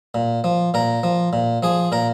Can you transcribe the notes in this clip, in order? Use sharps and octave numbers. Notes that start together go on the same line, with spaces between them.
A#2
F3
A#2 A#4
F3
A#2
F3 G#4
A#2 A#4